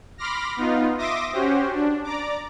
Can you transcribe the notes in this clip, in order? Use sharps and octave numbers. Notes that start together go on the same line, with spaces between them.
B5 C6 D6 F6 A#6
B3 D#4 F4
E5 C6 D6 D#6 A#6
C#4 F#4 G4 C5
D4
D5 A#5 D6